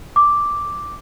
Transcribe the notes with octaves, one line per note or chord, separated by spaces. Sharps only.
D6